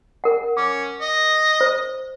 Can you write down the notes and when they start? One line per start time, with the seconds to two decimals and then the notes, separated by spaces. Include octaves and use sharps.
0.24 A#4 F#5
0.57 C#4 D6
1.01 D#5
1.61 C5